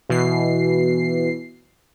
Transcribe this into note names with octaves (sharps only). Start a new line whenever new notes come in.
B2 E3 C7